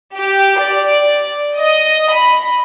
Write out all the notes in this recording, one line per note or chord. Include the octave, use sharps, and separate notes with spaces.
G4
D5
D#5
B5